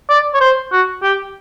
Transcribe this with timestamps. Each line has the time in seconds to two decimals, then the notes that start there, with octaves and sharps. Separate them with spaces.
0.10 D5
0.34 C#5
0.41 C5
0.72 F#4
1.03 G4